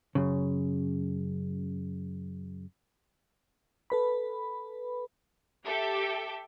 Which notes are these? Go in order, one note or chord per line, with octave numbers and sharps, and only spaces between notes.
F#2 C#3
A4 B4 B5
G4 A4 E5 G5